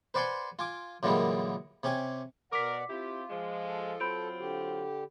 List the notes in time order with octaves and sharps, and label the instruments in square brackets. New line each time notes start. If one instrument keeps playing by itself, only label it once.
[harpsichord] B4 C5 D5 F#5 G#5 C6
F4 G#5 D6
F#2 A#2 D3 E3 G3 G#3
C3 C#4 G4 G#5
[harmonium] B2 D5 F#5 [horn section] A#4 [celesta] D6 B6
[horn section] C4 E4 G4 [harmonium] F4
[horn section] F3 G#3
[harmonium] A4
[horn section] F#3 C4 F4 [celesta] B5 G6 D7
[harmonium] D3 G4